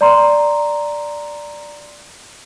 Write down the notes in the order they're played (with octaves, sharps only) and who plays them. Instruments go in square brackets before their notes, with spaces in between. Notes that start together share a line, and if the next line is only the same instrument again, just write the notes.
[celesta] D5 A#5 C6